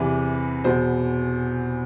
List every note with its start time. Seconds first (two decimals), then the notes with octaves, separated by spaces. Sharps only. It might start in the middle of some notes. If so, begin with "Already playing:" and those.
Already playing: E2 C3 E3 B4
0.64 E2 B2 C5